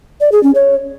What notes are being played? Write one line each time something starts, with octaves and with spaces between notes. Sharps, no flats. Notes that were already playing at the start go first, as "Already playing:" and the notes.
D5
G#4
C#4
C#5